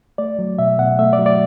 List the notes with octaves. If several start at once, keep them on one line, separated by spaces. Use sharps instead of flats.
A3 D5
F#3
B2 E5
B2 F#5
A3 E5
D5
F#3
D5